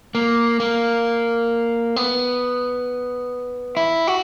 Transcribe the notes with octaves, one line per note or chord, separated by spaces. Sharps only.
A#3
A#3
B3
E4
F#4